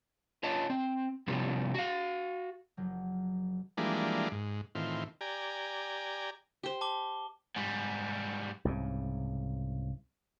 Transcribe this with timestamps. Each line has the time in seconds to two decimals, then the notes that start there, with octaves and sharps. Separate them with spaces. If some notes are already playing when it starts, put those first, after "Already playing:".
0.43 F4 C#5 D#5 A5
0.70 C4
1.27 C3 F3 G3 B3 C#4 E4
1.74 F#4 F5
2.77 F#1 F3 F#3 G6
3.77 E3 F3 G3 G#3 A#3 D4
4.31 G#2
4.75 A2 D#3 E3 C4 F4
5.21 G4 D5 G#5 A#5
6.63 G4 C5
6.81 A5 D6 G7
7.56 G#2 G3
8.65 C2 G#2 C#3